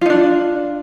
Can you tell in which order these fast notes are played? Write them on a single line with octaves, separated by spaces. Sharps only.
F4 D#4 D4